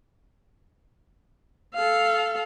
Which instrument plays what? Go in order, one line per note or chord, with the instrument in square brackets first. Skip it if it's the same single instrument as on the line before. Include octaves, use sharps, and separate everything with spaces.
[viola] A4 F5